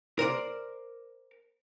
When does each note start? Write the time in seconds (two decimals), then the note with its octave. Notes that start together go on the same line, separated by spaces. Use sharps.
0.19 A#4 C5 D5